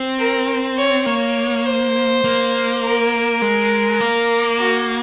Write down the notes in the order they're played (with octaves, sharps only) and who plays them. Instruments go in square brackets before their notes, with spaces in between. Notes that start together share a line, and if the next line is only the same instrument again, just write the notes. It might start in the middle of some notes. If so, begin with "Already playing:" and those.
Already playing: [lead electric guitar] C4
[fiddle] A#4
C#5
[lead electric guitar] A#3 [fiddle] C#5
[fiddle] C5
[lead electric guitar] A#3
[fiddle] A#4
[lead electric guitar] G#3
A#3
[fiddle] F#4